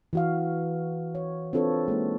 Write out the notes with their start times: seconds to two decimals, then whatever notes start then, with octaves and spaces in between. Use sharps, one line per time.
0.13 E3 F#4 F5
1.15 C#5
1.53 C4 D4 F4 A4 B4 C#5
1.88 G#3 A#3 D#4